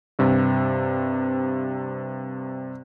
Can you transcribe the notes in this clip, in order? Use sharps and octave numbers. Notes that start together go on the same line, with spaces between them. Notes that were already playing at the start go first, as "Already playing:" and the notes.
G2 C3